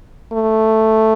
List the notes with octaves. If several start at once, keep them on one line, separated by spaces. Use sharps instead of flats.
A3